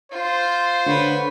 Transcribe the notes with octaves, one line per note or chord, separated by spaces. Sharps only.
F4 C5
D3 B4 C#5